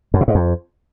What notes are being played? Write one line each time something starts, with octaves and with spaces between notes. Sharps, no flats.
F#2
B2
G#2
F2